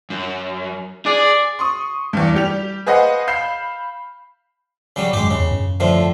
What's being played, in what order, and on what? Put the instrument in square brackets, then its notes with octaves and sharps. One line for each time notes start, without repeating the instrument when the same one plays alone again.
[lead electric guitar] F#2
[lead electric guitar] G#4 [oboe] D5
[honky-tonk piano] C6 C#6 D#6
E2 G2
G3 G4 F7
G#4 B4 C5 D#5 F5 F#5
F5 B5 G6 C7 E7
[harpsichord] C#3 F#3 G3
[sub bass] F#2 [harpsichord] G#3 G4
[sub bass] E2 [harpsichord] C#3
[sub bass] F#2
[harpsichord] A2 D3 F3